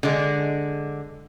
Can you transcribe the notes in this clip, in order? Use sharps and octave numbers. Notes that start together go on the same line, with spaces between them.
D3 G#3